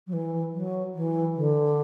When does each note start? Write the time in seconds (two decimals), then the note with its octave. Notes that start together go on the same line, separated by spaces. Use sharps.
0.07 F#3
0.13 E3
0.54 F#3
0.95 E3
1.36 D3